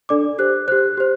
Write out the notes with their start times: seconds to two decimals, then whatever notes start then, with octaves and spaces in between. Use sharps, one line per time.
0.09 D4 A4 D5 D6
0.38 G4 C5 F#6
0.68 G4 C5 F#6
0.97 G4 C5